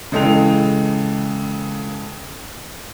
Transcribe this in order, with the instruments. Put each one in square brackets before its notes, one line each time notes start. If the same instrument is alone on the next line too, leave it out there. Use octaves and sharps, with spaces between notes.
[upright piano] C#3 E3 G#3 A4 G5 F7